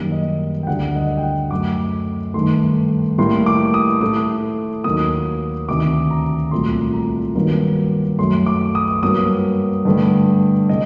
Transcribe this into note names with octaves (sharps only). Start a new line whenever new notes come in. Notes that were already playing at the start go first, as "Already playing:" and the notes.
Already playing: F#2 D#3 G3 A#3
D#5
G5
D2 D3 G3 F#5
D#5
G5
F#5
F#2 F#3 A3 D6
G2 D#3 A3 C6
A2 G3 A#3 C6
D6
D#6
A2 A3 D#6
D#2 D#3 F#3 A#3 D#6
D2 C3 D#3 D6
A#5
C2 A#2 F#3 A3 C6
A#5
G2 D#3 F#3 A#3
F#2 F#3 A3 C6
D6
D#6
G2 F#3 A#3 D#6
G2 D3 A3
C3 D#5